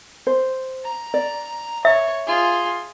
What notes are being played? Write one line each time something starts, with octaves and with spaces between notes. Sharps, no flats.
C5
A#5
D5
C#5 E5
F4 G#4